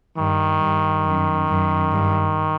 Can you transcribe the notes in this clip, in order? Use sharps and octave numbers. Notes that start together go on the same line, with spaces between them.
G2 D#3
G2
F#2
F#2
G2